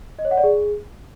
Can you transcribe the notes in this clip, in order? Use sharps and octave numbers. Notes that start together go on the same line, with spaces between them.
D#5
C#5
F#5
D5
G#4